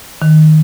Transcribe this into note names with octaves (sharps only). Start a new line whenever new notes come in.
D#3